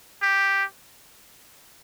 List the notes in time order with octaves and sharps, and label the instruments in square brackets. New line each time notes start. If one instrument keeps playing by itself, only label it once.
[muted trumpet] G4